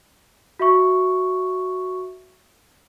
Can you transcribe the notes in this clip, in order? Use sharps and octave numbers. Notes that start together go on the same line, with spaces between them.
F#4 E5 C#6